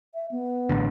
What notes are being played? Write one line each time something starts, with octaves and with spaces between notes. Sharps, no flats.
E5
B3
A1 A2 D3